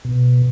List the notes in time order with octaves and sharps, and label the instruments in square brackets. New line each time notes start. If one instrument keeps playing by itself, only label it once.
[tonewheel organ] B2